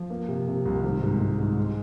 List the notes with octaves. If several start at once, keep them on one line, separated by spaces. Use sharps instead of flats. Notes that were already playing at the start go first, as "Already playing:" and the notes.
Already playing: F3
A#3
C3
C3
C2
G#1
G#2
G#2
G#2
G#3